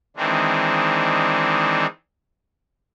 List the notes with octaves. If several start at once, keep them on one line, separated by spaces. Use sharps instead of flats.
D#3 E3 G#3 C4 D4